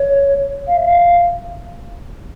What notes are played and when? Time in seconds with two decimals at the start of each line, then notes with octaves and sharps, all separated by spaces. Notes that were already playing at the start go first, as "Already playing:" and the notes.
Already playing: C#5
0.67 F5
0.77 E5
0.87 F5